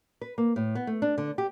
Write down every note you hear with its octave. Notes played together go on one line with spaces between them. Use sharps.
B4
A#3
A2
B3
A3
D4
D3
G4